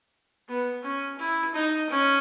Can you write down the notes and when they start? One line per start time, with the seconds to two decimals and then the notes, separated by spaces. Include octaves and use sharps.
0.48 B3
0.83 C#4
1.19 E4
1.54 D#4
1.90 C#4